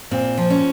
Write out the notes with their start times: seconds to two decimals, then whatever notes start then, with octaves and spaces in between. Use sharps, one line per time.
0.11 A#2 C4
0.37 F3
0.50 C#4